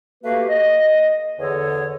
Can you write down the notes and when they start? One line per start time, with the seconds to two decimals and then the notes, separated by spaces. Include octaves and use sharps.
0.23 A3 A#3 F#4 G4 B4 F5
0.49 D#5
1.39 E2 D3 G#4 A4 C#5